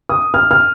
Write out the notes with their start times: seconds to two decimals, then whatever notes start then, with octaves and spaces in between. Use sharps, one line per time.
0.09 D#6
0.34 F6
0.51 F6